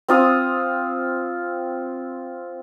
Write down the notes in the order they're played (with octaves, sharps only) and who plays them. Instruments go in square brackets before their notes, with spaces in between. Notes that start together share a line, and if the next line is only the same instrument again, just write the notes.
[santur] C4 F4 D#6